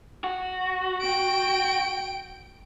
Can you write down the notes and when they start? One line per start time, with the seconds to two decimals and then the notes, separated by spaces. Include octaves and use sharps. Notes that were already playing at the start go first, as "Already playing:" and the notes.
0.24 F#4
1.02 G5 D7